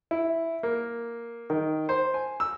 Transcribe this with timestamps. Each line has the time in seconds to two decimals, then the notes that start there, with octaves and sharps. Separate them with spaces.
0.11 E4
0.63 A#3
1.50 D#3
1.89 C5
2.14 G#5
2.40 E6